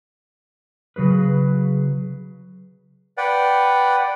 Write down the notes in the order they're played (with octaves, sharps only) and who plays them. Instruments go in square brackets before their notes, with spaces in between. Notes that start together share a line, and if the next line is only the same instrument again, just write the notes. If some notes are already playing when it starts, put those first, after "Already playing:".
[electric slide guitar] C#3 F#3 G#4 B4
[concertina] B4 D5 F#5 G5